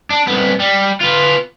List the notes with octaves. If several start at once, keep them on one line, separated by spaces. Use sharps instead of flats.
D4
C2 B3
G3
B3 F4